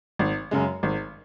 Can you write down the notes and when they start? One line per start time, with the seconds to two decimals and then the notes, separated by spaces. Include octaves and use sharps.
0.19 G#1
0.51 F#2 C#3 G#3
0.83 G#1